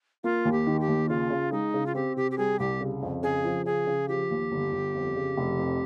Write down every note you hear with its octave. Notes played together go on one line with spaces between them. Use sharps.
A#3 F4
D#2
G4
D#3
G4
D#2
C#3 F4
C#3
G#3 D#4
C#3
F4
C4 G4
C3 G4
G4
G3 G#4
C2 G4
C#3
F2
C#3 G#4
F3
C#3 G#4
C#3
F3 G4
D#2
G1
G1
F2
C#3
F1
F2